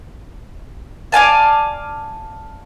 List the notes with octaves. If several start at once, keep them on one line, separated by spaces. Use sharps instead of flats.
D5 F5 G#5 A5